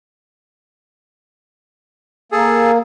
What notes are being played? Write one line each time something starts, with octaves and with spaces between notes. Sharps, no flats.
A#3 G#4 A4